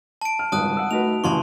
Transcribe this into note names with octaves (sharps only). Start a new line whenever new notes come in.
A5 D7
F6
G#1 C#2 G3 A5 D#6 F#6
F#5 E6
A3 D#4 F#4 B4 F7
A1 C#3 E3 E4 A5 C6 C#6